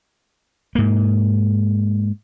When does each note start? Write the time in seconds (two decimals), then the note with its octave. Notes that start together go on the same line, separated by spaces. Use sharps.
0.75 G#2 A#3